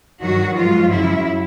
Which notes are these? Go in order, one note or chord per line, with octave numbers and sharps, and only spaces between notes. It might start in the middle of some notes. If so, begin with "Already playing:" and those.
G2 D#3 F#3 F#4
G#2 F3 F4
F#2 C#3 F#3 E4